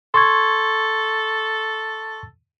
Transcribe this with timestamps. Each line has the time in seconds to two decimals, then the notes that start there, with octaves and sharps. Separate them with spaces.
0.14 A4 C6 C#6 G#6